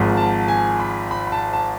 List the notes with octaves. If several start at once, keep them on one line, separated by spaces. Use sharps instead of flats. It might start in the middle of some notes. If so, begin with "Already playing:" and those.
Already playing: G#1 G#2 F3
A5
G#5
B5
B5
B5
A5
A5